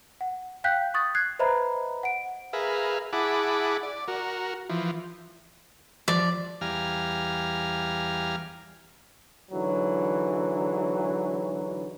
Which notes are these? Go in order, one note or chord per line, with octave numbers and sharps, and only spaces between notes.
F#5
F5 G5 F#6 G6 B6
C#6 D#6 A6
F#6 G#6 C7
B4 C5 D#5 E5 A#5 B5
F#5 D7
G#4 A#4 B4 E5 F5
E4 G#4 F#5 A5 B5 D6
D5
F#4 A#4
E3 F3
F3 D5
E2 G3 F5 G#5 A#5 F6
G#2 D3 E3 F#3